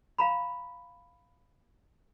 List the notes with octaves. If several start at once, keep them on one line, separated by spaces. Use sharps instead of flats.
F5 A#5 B5